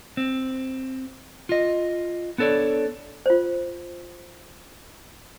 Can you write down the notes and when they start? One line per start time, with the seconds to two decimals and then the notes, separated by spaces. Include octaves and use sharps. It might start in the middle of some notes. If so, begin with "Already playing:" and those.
0.17 C4
1.49 F4 D#5
2.38 B3 D4 A4 C#5 D5
3.26 F4 C5